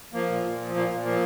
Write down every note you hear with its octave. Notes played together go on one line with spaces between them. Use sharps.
F3 A#3
A#2
A#2
F3
A#2 A#3
A#2
F3 A#3